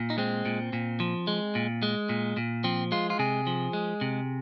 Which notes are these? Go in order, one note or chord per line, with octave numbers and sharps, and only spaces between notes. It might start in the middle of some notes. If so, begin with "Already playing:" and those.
Already playing: A#2
D#4
G#3 C4
A#2
A#2
F3
G#3
A#2
G#3
A#2
A#2
F3 C4
G#3 F4
F4
C3 G#4
F3
G#3
C3